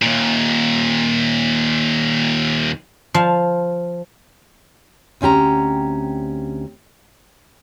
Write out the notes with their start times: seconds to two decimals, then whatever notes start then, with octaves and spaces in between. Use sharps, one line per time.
0.02 D#2 A#2
3.14 F3 F5 A5
5.21 D2 C4 C#4 G4 A#5